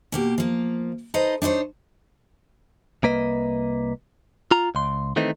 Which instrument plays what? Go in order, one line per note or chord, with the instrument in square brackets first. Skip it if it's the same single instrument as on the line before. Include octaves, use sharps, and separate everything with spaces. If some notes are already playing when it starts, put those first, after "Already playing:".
[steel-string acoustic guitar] B2 A#3 G4
F3 A#3
D#4 A4 B4 C5 D#5
D4 D#4 A4 C5 C#5
[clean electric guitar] C2 A#3 B4 D#5
F4 A#5
C#2 C6
D#3 E3 A3 C4 D#4